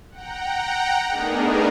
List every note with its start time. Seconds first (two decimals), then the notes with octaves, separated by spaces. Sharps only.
0.11 F#5 G5 A#5
1.08 A3 B3 D4 D#4 G#4 A#4